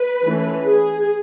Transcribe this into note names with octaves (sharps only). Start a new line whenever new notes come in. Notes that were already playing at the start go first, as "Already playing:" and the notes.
Already playing: B4
E3 A3 C#4
G#4